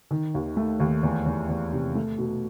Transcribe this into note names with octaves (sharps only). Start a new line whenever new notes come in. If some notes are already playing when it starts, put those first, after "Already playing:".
D#3
D#2
A3
D#2
E2
E2
E2
C3
A3
B2